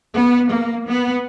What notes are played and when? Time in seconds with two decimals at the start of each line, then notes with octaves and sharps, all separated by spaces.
0.15 B3
0.50 A#3
0.86 B3